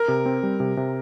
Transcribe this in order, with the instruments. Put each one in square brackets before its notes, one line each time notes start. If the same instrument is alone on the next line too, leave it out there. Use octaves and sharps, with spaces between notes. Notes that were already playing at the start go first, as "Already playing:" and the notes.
Already playing: [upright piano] A#4
[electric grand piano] C3
C4
G3
C3
C3